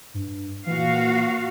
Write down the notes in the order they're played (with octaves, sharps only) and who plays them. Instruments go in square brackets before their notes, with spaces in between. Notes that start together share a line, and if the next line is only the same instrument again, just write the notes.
[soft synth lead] G2
[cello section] A#2 F#4 F5 [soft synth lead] E3